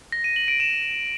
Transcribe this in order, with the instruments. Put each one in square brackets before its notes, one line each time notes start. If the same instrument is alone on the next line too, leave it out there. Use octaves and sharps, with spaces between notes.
[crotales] A#6
D#7
F#7
D7
E7